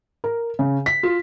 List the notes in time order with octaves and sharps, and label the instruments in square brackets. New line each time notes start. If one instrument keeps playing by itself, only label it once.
[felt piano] A#4
C#3
B6
F4